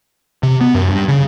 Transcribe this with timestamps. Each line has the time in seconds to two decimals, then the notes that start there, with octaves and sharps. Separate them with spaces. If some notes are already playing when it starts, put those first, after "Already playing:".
0.43 C3
0.61 B3
0.75 F#2
0.89 G2
1.08 C#3